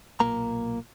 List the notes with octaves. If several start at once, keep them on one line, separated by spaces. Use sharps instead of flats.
B1 A#2 A#3 A#5